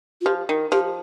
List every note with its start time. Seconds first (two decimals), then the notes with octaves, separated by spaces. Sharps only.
0.21 F4
0.25 F3 G4
0.49 D#3
0.72 F3 G4